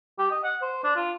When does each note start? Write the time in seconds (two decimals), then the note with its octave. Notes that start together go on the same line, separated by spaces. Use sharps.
0.19 G4
0.31 D#5
0.44 F#5
0.62 C5
0.84 D4
0.96 F4